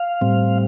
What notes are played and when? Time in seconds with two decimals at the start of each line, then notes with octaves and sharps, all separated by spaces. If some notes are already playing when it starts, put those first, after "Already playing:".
Already playing: F5
0.21 A2 G3 C4